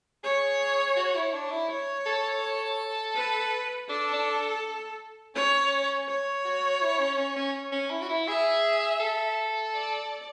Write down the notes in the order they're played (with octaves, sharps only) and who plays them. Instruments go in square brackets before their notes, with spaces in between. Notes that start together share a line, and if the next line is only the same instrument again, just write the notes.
[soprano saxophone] G#4 [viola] C#5
[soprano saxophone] F#4
E4
D4
E4
[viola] C#5
[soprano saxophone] A4
[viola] B4
[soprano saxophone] D4 [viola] A4
[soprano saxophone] D4
[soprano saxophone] C#4 [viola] C#5
[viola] C#5
[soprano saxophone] F#4
E4
C#4
C#4
C#4
C#4
E4
F#4
E4
[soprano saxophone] G#4 [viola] E5
[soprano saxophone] A4
[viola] D5